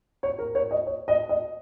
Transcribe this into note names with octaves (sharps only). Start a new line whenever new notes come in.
C#5
A#4
C#5
D#5
C#5
D#5
D#5